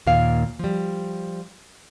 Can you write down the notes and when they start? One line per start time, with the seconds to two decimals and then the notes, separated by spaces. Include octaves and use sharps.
0.07 D#2 A#2 A#3 F5
0.59 F3 G3